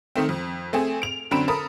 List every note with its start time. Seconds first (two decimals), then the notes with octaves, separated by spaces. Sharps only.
0.16 D#3 A3 C4
0.29 F2
0.73 A3 C4 G#4
1.02 D7 F7
1.31 F#2 D3 C4 B5 D7 E7
1.48 A4 A#4 B5 D#6